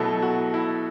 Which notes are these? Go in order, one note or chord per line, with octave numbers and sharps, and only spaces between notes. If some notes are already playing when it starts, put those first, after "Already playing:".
Already playing: B2 F#3 A3 E4 A4
F#4
E4